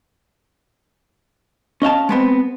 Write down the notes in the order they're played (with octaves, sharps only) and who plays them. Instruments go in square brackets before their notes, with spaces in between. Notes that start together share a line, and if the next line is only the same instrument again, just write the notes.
[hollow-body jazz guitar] C#4 D#5 F5 A5
G#3 B3 C4